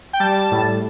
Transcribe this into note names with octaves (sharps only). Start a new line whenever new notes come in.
G5
G3 A5
A2